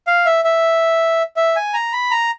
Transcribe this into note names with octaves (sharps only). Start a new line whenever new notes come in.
F5
E5
E5
E5
G#5
A#5
B5
A#5